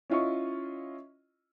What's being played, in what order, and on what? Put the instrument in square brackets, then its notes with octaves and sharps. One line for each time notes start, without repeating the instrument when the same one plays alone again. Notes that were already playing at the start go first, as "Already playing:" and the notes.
[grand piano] C#4 E4 F4 D#5 C#6